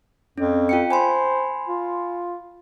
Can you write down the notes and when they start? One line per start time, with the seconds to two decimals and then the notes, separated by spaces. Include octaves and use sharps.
0.38 F2 C#4
0.69 F4 G5 C#7
0.90 C5 G#5 B5 C6
1.68 F4